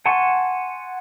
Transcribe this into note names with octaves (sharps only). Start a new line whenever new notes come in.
F#5 G#5 A5 C6 C#6